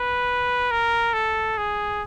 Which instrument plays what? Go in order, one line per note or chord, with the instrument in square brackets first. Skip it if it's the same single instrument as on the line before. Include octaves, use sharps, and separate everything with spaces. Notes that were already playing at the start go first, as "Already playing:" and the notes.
Already playing: [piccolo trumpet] B4
A#4
A4
G#4